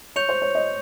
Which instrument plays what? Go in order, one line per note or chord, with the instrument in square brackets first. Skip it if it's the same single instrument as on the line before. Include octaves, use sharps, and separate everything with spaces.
[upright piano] C#5 [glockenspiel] C#6 G6 C#7 F7
[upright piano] C5
C#5
D#5